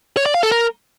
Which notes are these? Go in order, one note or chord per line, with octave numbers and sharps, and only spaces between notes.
C#5
D5
F5
A4
A#4